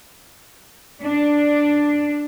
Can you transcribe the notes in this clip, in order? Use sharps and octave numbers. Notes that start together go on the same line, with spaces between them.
D4